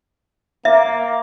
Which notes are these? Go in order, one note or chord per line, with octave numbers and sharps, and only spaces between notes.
A#3 E5